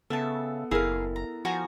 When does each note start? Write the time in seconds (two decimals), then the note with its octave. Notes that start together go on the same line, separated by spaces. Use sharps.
0.10 C#3 B3 A4 E5 A5
0.71 F#1 E4 G#4 A#4 F5
1.16 A#5
1.45 F3 F#4 G#5 A#5